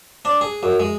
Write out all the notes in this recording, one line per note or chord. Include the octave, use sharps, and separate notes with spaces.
D4
G#4
F#2
G#3